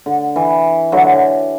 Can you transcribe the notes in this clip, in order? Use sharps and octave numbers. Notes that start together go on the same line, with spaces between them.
D3
E3
D3 F#3